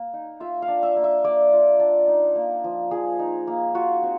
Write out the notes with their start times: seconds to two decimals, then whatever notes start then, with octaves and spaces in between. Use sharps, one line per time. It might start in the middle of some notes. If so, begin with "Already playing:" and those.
Already playing: A#3
0.14 D#4
0.40 F4 E5
0.62 F5
0.68 D4
0.83 E5
0.96 A#3
1.04 E5
1.24 A#3 D5
1.52 F4
1.80 D4
2.08 D#4
2.35 A#3
2.64 F3
2.91 F3 G#4
3.19 D#4
3.47 A#3
3.75 F4 F#4
4.03 C4